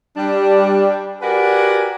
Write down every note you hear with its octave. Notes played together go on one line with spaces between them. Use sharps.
G3 D4
F#4 G4 A#4 B4 D5 G#5